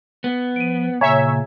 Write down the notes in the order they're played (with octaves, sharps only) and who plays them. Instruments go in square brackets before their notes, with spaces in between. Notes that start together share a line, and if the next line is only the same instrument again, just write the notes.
[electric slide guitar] B3
[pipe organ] F3 [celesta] D7 D#7
[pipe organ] A#2 C#3 A#3 [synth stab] C#5 E5 [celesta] G#5 A#5 G#6